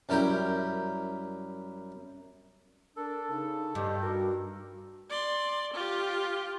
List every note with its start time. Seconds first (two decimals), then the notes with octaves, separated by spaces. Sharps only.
0.09 F#2 G3 E4 A#4 G5
2.97 D4 A4 A#4
3.30 C#3 D#4
3.75 G2 G4 D#5
4.01 F#4 A#4
5.10 D5 C6
5.73 F4 G4